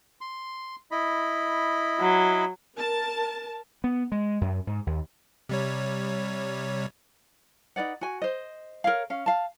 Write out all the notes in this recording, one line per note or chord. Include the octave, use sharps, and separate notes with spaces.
C6
E4 D#5 B5
F#3
A#4 A5
B3
G#3
F#2
G#2
D#2
C3 G3 C#5
D#4 B4 D5 F#5
F#4 G#5
C5 D#5
A#4 C#5 F5
C#4 F5
F5 A5